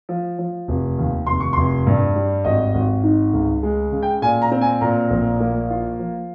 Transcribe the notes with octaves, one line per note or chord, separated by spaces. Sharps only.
F3
F3
F1
D#2
F1 C6
C#6
F1 C6
G2
G3
G#1 D#5
G#1
D#4
C#2
G#3
C#3
G5
A#2 G#5
A#5
C4
G#5
A#2 A#5
A#1
A#3
F4
F3